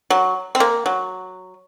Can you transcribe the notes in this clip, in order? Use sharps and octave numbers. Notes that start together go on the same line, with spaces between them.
F#3
C4
A#3
F#3